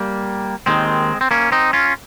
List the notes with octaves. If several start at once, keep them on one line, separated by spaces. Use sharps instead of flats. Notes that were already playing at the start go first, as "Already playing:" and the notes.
Already playing: G3 A#3
D#2 D#3 G#3 C4
C4
A#3 C#4
C4 D#4
C#4 F4